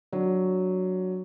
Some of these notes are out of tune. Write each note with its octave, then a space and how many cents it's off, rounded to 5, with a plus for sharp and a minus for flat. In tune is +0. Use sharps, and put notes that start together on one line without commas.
F#3 +0 D4 +0